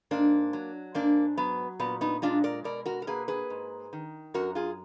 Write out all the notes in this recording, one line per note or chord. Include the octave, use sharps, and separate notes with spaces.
G#2 A#3 D4
F#3
G#2 A#3 D4
F#3 B3
A#2 B3
B3 D#4
G#3 D4 F4
A#4 D5
B2 A#4 D5
F#4 A#4
A#4
A#3 G#4 B4
G#4 B4
G#2
D#3
F#2 F#4 A#4
F4 G#4